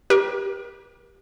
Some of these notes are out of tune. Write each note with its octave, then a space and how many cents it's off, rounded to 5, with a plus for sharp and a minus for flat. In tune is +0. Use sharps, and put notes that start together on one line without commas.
G4 +0 A#4 +40